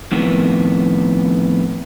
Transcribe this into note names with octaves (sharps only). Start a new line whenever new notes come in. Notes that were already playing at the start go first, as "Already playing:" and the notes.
F2 A2 D#3 B3